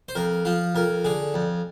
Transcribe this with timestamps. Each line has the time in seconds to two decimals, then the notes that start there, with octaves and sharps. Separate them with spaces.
0.09 C5
0.15 F2 A#4
0.45 F3 F4
0.75 F2 A#4
1.05 D3 G#4
1.34 F2